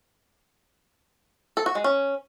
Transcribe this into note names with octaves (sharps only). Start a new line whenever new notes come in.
A4
F#4
G#3
C#4